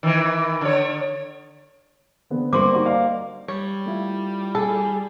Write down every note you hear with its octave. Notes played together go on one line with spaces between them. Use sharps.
D#3 E3
D3 C#5
D3 B3 C4
D3 G3 A#3 G4 C5 C6 D6
D4 D#4 F#4
D5 D#5 F5
G3 C#5
A3 E4 F4
G#4 A4